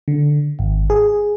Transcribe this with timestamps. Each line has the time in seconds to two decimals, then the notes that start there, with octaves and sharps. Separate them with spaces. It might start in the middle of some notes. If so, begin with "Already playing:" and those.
0.08 D3
0.59 G#1
0.90 G#4